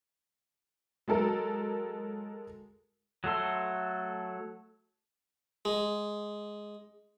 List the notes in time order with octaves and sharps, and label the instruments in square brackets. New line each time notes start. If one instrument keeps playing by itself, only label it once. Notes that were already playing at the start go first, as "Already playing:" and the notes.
[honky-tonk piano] F#3 G#3 A4 A#4
[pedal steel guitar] F#3 A3 A4 C6
[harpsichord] G#3